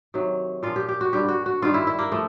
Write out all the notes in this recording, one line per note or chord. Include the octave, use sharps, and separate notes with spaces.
C3 D#3 F#3
A#2 F3 F4
G4
G4
F#4
G2 D3 G3 G4
F#4
F#4
G2 D#3 G3 F4
E4
E4
A#3
F3 A3